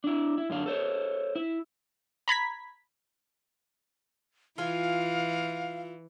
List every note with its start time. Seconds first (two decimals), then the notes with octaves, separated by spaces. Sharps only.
0.04 D4 E4
0.38 E4
0.50 F#2 D3 F5
0.66 A4 C5 C#5
1.35 E4
2.28 A#5 B5 G#6 B6
4.58 E3 F4 F5 G#5